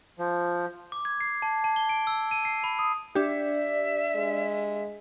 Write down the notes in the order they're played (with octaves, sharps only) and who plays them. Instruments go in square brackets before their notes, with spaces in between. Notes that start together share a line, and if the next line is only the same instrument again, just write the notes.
[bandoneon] F3
[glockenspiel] D6
G#6
C7
A5
A5
G7
D7
E6
D#7
C7
B5
D#6
[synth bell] D4 G4 [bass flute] D5 [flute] E5
[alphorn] G#3